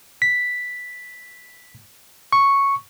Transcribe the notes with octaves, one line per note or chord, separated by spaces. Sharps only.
B6
C#6